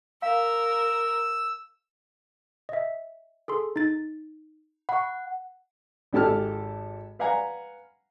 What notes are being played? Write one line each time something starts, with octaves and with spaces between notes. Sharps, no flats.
A#4 F5 E6
D#5 E5
G#4 A4 C6
D#4 A6
F#5 B5 C#6
G#1 G#2 G4 A4 A5 F6
B4 F5 F#5 G#5 A#5